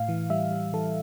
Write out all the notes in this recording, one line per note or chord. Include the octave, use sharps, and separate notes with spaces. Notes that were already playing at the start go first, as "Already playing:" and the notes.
Already playing: A2 F5
E3
G3 E5
G3
E3 A4